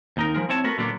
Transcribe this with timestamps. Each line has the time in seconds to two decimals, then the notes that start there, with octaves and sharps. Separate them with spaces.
0.17 D#2 D#4 A#4
0.34 F3 G#3 A#4
0.49 C4 E4 C#5 A5
0.64 A3 B3 F#4 A#4
0.77 A#2 D3 F#3 A#3 B3 D4